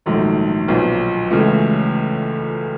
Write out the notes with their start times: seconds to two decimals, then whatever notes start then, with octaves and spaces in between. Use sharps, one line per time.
0.06 A#1 G#2 D#3 F#3 A3
0.68 B1 A#2 F3
1.30 C#2 C#3 E3 A3